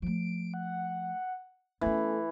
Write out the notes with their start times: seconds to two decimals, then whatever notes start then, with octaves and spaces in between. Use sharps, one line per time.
0.02 F3 A3 D7
0.54 F#5
1.81 E3 A3 B3 C#4